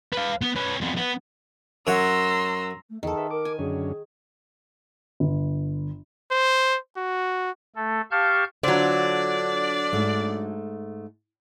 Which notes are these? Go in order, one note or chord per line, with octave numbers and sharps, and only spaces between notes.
B4 F5
B3
C#4 B4
F2 B3
B3
F#2 C#5 F#5 A#5 C6 E6
A3
E2 D#3 G#4 A4
B4 E5
A#4 D6
G#5
F#2 D3 C#4 G#4
G1
C5
F#4
A3 A4
G4 F5 A5 C#6 F6 G6
D3 F#3 D4 F4 C5 D5
G#2 A3